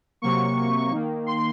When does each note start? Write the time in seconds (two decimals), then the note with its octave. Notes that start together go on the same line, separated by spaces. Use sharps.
0.22 C3 F#3 A#3 C#6
0.91 D#3 A#3
1.26 C6